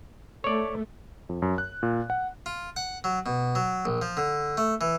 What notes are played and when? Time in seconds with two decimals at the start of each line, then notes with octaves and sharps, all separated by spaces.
0.44 A3 C#5 D5
1.29 F2
1.42 F#2
1.58 F#6
1.83 A#2
2.10 F#5
2.46 F4
2.76 F#5
3.04 F#3
3.26 B2
3.55 F#3
3.85 A#1
4.02 F3
4.17 D3
4.57 A3
4.81 E3